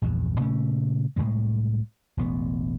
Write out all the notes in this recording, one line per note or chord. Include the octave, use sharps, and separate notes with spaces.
A#1 E2 G2
A#2 C#3 A3 C#4
C2 F2 A2 G#3
E1 A1 B3